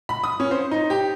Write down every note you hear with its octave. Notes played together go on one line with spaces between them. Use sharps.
B5
D#6
C#4
C5
D#4
G4